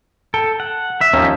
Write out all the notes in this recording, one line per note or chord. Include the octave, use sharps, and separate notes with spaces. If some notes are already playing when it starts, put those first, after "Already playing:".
A4 G5
F#5
E5
D#2 F3 C#4 D#4